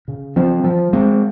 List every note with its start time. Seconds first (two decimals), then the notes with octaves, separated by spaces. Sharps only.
0.08 C#3
0.36 F3 C4
0.64 F3
0.93 G#3 C4